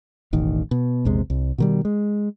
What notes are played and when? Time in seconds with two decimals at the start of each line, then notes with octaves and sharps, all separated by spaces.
0.33 E1 A1 D#3
0.71 B2
1.05 A#1 E2 C3 G#3
1.30 C2
1.58 B2 D#3 G3
1.85 G#3